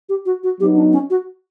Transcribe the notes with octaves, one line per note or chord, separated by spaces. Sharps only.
G4
F#4
F#4
F#3 B3 D#4 G4
D4
C#4
F#4